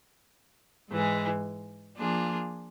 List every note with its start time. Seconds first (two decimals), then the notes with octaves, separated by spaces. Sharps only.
0.90 G#2 E3 G#3
1.97 F3 A#3 D4 F4 G#4